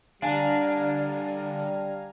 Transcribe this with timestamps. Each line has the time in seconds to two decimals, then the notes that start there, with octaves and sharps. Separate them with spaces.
0.22 D3 G3 D4 F5 G#5 A#5